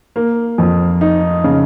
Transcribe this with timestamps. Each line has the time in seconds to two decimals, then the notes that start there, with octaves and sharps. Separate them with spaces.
0.16 A#3
0.58 F2
1.01 D#4
1.44 C#3